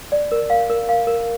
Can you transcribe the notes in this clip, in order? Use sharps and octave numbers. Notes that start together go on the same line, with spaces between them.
D5
A#4
F5
A#4
F5
A#4